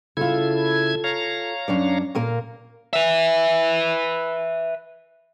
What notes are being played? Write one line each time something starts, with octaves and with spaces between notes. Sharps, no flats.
C#3 E4 F4 A4 G#6
C#5 F5 A#5
F#2 D4 D5
A#2 A#3 A#4
B4 E5